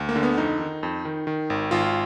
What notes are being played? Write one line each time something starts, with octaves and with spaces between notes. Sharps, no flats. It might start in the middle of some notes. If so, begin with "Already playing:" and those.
Already playing: D2
A#3
D3
B3
F2 D#4
D#3
F2
D#3
D#3
G#1
G#1 F4